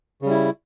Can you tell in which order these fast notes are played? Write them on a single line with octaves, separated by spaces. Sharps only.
C#3 G3 E4